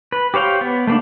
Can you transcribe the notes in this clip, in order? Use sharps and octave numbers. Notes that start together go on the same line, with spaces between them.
B4
G4 C5 C#5 F5 G5
B3
A3 A#3 D4